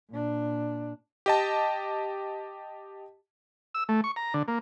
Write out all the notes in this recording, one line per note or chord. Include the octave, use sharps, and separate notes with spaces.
A#2 D4
G4 D#5 A5
E6
A3
C#6
A#5
D3
A#3